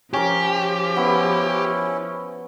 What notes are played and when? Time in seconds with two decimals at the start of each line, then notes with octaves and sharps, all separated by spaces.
0.13 F3 C#4 G4 A#4
0.97 B3 C#4 E4